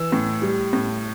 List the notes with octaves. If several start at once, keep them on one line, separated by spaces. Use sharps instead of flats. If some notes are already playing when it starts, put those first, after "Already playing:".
Already playing: E3 E6
A2
G3
A2